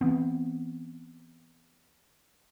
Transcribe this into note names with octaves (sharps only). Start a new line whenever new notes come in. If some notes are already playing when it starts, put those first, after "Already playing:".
E3 B3 C4